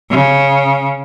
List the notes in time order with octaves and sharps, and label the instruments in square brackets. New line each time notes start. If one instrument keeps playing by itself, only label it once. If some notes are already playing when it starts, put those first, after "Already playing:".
[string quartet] C#3